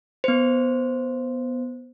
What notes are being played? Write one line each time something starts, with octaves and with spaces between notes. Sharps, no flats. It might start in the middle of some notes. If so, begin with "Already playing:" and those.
B3 C5